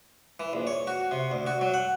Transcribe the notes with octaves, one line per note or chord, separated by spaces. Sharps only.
E3
A#1
C#5
F#4
C3
D2
F#4
F#3
F#5